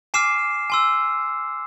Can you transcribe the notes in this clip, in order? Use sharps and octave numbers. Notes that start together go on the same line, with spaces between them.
G#5 D6 F6 C7 E7
G#5 C6 E6